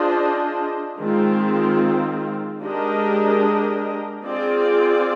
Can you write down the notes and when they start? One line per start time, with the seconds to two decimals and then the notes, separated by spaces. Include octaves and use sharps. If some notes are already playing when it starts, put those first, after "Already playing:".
Already playing: D4 F4 G#4 C5 D#5
1.00 D#3 G#3 C4 F4
2.63 G#3 D4 G4 A#4 D#5
4.25 C4 F4 G#4 D5